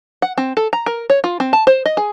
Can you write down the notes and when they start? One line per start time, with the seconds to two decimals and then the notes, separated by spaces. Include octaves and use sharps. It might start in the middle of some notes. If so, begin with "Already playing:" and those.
0.22 F#5
0.38 C4
0.57 A4
0.73 A#5
0.86 A#4
1.10 C#5
1.24 F4
1.40 C4
1.53 A5
1.67 C5
1.86 D#5
1.97 G#4